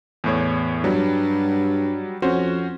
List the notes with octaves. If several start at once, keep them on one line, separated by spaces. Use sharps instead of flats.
E2 A2 C#5
G2 F#3 G3
F2 C#4 F#4 C5